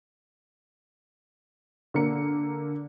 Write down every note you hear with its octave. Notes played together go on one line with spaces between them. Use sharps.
D3 A#3 C#7